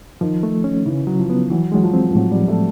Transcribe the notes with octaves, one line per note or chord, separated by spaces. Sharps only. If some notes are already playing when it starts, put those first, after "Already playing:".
D#3 F3
A3
C#4
C#3 E3
F#3
F3
B3
E3 F#3
F#3 G#3
F3
C4
F3
A2 F#3
G3
F3
A3